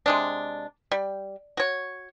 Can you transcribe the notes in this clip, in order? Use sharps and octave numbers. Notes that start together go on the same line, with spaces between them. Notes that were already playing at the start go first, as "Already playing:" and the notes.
C3 G#3 D4
G3
F#4 C#5